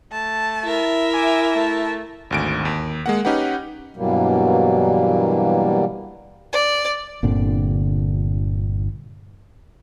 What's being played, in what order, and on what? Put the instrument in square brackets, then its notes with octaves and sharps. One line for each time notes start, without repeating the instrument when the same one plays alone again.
[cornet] A3 [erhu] A5
[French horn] E4 [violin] A#4 E5
[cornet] G#5 [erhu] D6
[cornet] A3 [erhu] A5
[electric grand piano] G#1 D2 D7
D#2
G#3 A#3 F#5
C#4 D#4 G4 B4 F#5
[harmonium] G2 B2 E3 F#3 G3 A#3
[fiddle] D5
[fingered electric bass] G1 A#2 D3 C4